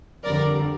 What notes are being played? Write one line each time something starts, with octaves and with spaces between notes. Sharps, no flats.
F2 D3 G3 A#4 D5